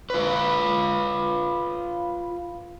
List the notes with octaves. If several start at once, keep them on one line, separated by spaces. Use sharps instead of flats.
F4 B4